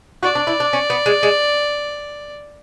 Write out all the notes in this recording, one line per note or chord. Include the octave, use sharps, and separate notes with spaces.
F#4 D5
D4
E4
D4
C#4
B3
G#3
G#3